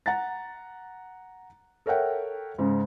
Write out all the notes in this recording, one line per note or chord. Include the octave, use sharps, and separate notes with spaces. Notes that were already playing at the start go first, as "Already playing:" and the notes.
F#5 A#5 A6
A4 A#4 C#5 E5 F#5 G5
G#2 C#3